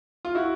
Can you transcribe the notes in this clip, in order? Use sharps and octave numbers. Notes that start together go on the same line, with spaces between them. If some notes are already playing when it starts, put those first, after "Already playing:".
F4
E4 F#4